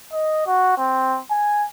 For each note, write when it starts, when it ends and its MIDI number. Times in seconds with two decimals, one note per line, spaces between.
0.13 0.46 75
0.47 0.77 66
0.77 1.19 60
1.31 1.67 80